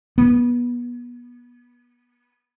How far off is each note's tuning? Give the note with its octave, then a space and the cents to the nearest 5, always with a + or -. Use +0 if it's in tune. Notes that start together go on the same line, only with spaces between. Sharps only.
B3 -30